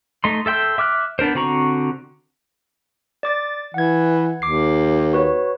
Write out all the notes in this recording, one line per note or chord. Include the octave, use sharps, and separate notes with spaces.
A3 D#4 C6
A4 E5 G5 C6 E6
E5 D6 F6 F#6
B3 D4 A#4 C5
D3 C4 F#4 A#5 C#6
D5 D6 A6
E3 F#5 G#6
D#2 D6 C7
F#4 B4 C#5